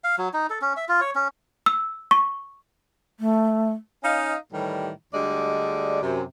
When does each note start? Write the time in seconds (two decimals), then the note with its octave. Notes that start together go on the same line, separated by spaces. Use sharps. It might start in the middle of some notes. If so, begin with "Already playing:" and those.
0.04 F5
0.18 F#3
0.33 D#4
0.50 A4
0.62 C#4
0.77 E5
0.89 F4
1.01 C#5
1.15 C#4
1.66 E6
2.11 C#6
3.20 A3
4.03 C#4 D#4 D#5 F5
4.52 A2 D#3 E3 G3
5.13 D2 D3 G3 G#3 D5 D#5
6.02 F#2 C3